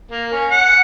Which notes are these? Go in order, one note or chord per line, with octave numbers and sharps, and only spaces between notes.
A#3
C#4
F#5